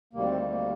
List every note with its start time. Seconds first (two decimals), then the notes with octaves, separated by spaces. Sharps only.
0.13 D2 C3 D#3 G3 A#3
0.25 C4
0.37 A#3
0.48 A#3